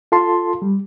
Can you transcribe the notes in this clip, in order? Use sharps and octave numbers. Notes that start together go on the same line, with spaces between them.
F4 A4 A5 C6
G3